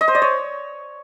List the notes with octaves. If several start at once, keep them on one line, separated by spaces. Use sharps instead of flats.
D#5
C5
D5
C#5